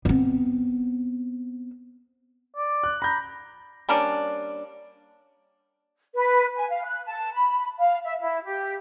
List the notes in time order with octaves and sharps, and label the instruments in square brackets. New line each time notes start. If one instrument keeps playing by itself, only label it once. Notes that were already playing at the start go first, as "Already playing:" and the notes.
[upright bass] B3 C4
[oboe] D5
[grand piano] F#6
[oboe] A#5 [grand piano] B5 G6
[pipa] G3 A#3 C#4 D4
[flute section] B4
G#5
F5
F#6
A5
B5
F5
E5
E4
G4